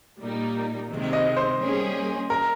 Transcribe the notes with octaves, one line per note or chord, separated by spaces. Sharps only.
A#2 G3 A#3 D#4
C3 D#3 G#3 C4
D#5
C5
G3 A#3 C#4 G#4
A#4